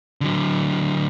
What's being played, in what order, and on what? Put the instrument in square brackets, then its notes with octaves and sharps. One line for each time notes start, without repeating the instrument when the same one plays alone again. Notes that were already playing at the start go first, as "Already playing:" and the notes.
[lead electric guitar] D3 F#3